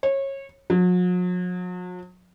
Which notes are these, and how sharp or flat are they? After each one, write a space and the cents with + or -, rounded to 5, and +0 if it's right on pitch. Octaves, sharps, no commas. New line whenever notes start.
C#5 -25
F#3 -45